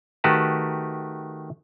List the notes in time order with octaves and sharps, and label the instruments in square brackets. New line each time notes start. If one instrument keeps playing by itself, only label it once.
[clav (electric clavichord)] D#3 A3 F#4 G4 B4 A5